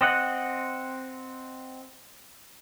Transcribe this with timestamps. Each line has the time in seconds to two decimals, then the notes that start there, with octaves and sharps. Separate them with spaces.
0.01 C4 D#5 F#5